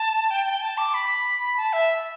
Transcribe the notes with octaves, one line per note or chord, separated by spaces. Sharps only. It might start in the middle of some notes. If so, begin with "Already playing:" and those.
Already playing: A5
G5
G5
A5
D6
B5
A5
E5